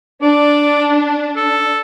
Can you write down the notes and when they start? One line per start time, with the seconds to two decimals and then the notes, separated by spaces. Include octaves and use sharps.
0.22 D4 D5
1.36 A4